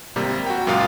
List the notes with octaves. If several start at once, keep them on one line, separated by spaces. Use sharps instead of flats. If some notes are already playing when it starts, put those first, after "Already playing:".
G#1 C3 G3 A#3
F#4 G5
C#2 F#2 A#2 F4 F5 D#6